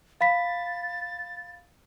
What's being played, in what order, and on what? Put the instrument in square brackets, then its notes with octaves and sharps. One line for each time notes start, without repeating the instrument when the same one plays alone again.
[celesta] F5 B5 B6 [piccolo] A6